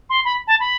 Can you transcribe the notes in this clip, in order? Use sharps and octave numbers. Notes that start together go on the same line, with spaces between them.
C6
B5
A5
B5